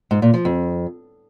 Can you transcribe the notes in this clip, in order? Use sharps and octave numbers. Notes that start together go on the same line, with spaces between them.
G#2
A#2
F3
F2